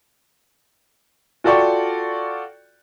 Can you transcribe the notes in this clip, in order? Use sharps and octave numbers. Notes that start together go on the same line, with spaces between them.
F4 F#4 A4 D5 G5 C#6